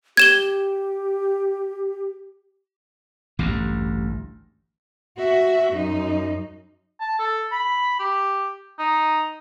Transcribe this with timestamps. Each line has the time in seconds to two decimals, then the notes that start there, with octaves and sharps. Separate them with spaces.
0.17 G4 G#6 E7 G7
3.39 A1 D2 G2
5.18 F#4 E5
5.74 F#2 D#4
7.00 A5
7.19 A4
7.52 B5
7.99 G4
8.79 D#4